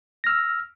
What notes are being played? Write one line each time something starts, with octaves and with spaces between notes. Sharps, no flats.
E6 F6 A#6